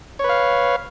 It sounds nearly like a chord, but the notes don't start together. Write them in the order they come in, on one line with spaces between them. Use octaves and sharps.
C#5 B4 F5